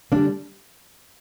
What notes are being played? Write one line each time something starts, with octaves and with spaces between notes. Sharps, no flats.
D3 G3 A#3 D4